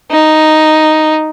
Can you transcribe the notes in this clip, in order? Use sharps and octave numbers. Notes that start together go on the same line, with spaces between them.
D#4